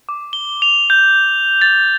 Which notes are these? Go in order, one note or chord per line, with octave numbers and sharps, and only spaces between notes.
D6
G7
F7
G6
A6